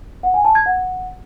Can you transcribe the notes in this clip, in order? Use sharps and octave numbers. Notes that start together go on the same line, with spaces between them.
F#5
G#5
A5
G#6
F#5